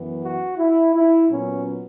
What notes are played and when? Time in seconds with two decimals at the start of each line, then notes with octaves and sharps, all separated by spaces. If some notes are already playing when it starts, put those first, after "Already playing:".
Already playing: F#2 E3 B3
0.23 F#4
0.58 E4
0.95 E4
1.30 A#2 F#3 B3 C#4